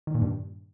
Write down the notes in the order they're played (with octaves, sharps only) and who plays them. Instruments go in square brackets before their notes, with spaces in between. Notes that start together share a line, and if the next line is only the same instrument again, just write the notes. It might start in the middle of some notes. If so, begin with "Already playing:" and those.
[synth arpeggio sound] D#3
A#2
G2